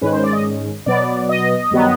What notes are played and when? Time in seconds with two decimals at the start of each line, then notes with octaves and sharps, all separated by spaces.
0.01 G#2 D#3 G#3 C#4 B4
0.13 C5
0.23 D5
0.33 D#5
0.86 B2 F#3 B3 D5
1.29 D#5
1.71 G2 D#3 F#3 B3